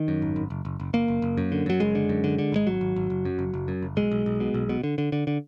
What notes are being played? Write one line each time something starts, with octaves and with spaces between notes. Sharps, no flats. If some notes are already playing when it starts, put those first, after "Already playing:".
Already playing: D#3
F#2
G#1
G#1
F#1
F#1
F#1
F#1 A#3
F#1
F#1
F#2
D3
F#2 F#3
F#1 G#3
D3
F#2
D3
D3
G#1 G#3
G#1 F#3
G#1
G#1
F#1
F#2
F#1
F#1
F#2
F#1
B1 G#3
B1
B1
B2
B1
B2
D3
D3
D3
D3